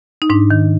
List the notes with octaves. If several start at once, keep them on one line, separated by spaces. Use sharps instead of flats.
D#4
G#2 D4
D#3